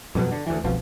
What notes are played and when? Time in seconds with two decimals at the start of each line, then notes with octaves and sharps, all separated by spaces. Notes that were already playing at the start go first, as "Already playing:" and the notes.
0.15 F2 B2 F#3
0.31 D3
0.47 D2 E3
0.64 F1 C2 B2 F3